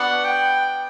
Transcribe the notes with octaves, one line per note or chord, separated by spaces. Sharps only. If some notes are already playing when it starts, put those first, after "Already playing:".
Already playing: B3 D4 F#4 F#5
G5